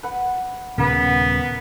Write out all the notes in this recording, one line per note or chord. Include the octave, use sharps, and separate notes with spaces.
B4 F#5 B5
D#1 C#3 B3 A#4 B4 F#5